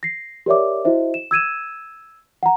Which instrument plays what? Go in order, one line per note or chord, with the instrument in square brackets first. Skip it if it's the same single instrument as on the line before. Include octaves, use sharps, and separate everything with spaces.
[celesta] A#6 C7
G4 A#4 C#5 D5 E5 D6
E4 F#4 C5 D#5 E5
E7
E6 G#6 D#7 E7
F#5 A#5